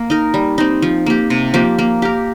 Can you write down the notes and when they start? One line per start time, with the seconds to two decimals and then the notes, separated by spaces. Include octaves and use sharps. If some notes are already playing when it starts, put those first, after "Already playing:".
Already playing: A#3
0.10 D#4 A#4
0.34 G3
0.58 C4 D#4
0.82 F3
1.06 A#3 G4
1.30 C3
1.54 F3 A#3 G4
1.79 A#3
2.02 G4 A#4